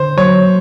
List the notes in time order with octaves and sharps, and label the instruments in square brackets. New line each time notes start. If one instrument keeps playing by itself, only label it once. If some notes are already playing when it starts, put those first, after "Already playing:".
Already playing: [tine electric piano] D3 [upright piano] C5
[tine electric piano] F#3 [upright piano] C#5